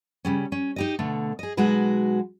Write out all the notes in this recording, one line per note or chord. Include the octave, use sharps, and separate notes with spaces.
C#3 G3 C#4
C#4
D#4 G4 D#5
B2 D3 A3
G#4 D#5
B2 F#3 G#3 D#4 F#4 B4